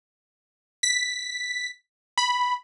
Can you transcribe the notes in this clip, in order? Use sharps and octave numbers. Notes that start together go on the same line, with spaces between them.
B6
B5